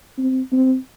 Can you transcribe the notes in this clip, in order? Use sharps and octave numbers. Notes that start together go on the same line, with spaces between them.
C4
C4